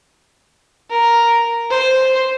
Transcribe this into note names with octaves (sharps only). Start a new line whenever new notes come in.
A#4
C5